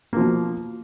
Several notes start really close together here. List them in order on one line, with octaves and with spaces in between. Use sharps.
A#3 F3 B2